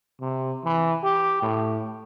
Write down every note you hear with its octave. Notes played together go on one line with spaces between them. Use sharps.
C3
E3
G4
A2